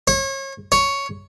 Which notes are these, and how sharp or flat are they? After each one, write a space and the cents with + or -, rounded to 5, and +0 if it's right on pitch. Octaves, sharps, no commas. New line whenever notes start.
C#5 -35
C#5 +5